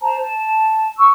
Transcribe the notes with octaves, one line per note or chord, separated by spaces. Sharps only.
C5 A5 A#5
A5
C#6 E6